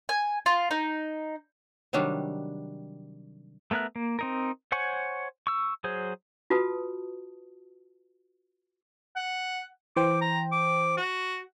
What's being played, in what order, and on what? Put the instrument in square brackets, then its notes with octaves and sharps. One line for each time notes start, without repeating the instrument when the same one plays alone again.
[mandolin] G#5
F4
D#4
[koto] C3 D#3 F#3 G3 D4
[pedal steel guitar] A3 B3 A#4 E5 F#6
A#3
C4 D#4 A#4
C5 C#5 F#5 G#5 C#6
C#6 E6
F#3 G#4 C5
[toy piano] F4 F#4 B4 A5 D#6
[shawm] F#5
[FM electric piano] E3 C5 G5 [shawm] D6
[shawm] A#5
D6
F#4